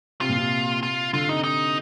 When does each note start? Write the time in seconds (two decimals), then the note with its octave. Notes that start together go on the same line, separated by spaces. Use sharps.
0.21 C3 F4
0.29 A#2
0.37 C3
0.83 F4
1.13 D3 F4
1.29 C3 D#4
1.44 D#4